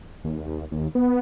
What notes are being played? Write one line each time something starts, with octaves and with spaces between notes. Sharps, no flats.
D#2
D#2
B3